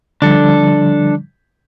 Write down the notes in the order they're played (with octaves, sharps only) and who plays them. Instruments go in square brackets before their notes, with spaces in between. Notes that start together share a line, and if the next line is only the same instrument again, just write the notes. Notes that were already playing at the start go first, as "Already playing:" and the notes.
[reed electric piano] D3 F3 G3 [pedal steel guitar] D4 A4